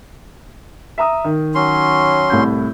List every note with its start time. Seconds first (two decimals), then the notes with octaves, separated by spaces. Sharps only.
0.98 E5 A#5 D#6
1.24 D#3
1.55 F#3 C#4 C6
2.30 C2 A2 G6